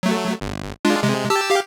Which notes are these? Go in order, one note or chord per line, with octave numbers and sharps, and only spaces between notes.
F#3 A3
G1
G#3 D4 F4
C3 G#3
G4 A5 E6
G4 F5